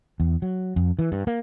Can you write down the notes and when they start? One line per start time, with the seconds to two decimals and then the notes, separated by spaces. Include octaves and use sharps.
0.20 E2
0.42 F#3
0.76 F2
0.99 E3
1.12 G2
1.27 A#3